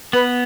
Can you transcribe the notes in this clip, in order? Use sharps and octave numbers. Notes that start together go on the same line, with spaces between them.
B3 B4